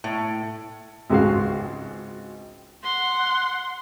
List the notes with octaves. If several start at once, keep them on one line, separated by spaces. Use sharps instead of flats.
A2
G#1 C#2 G#3 F#4 F5
F#5 C6